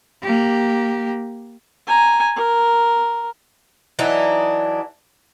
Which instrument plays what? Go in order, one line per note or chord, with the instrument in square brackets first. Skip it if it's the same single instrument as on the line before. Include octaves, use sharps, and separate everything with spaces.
[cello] A#3 G4
[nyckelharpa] G#5 A#5
A#4
[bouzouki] E3 F#3 D4 D#4